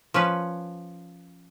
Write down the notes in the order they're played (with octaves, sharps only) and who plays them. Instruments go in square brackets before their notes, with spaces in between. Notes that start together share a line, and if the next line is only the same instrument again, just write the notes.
[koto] F3 C#4 B4